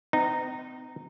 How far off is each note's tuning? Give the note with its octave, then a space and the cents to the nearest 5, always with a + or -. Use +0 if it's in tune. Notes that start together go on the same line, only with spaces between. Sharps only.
C4 -45 D#4 -15